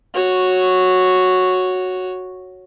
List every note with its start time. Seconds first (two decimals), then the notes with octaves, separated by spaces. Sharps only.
0.14 F#4 C#5